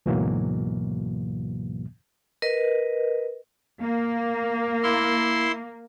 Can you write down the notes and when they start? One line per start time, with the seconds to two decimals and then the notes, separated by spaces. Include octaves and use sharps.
0.06 D2 G#2 B2 E3 F#3 A#3
2.42 A#4 B4 D#5
3.81 A#3
4.83 E4 C6